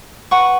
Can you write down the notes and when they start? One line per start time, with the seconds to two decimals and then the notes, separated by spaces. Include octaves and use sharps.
0.31 B4 F#5 C#6